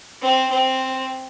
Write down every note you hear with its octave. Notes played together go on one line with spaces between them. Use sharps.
C4
C4